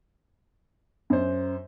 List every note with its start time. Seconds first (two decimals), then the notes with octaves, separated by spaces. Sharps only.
1.10 F#2 C5